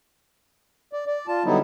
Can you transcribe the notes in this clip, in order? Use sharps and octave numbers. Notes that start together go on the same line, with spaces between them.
D5
D5
F4 A5
D3 F#3 G3 B3 D#4 E4